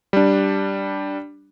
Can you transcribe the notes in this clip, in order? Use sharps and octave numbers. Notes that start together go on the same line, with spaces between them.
G3 D4